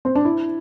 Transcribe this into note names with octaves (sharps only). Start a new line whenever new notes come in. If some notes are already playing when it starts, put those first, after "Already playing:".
C4
D4
E4